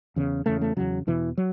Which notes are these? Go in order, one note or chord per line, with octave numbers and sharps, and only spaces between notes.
E2 C#3
E2 C#3 A3
A3
E2 C#3 F#3
E2 B2 E3
F#3